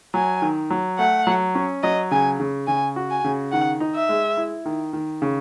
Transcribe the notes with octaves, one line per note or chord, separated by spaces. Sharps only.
F#3 G#5
D#3
F#3
A3 F#5
F#3
C#4
F#3 D#5
C#3 G#5
C#3
C#3 G#5
F#4
G#5
C#3
D#3 F#5
D#4
E5
G#3
E4
D#3
D#3
C#3